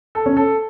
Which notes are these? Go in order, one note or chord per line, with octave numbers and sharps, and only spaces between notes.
A4
C#4
A4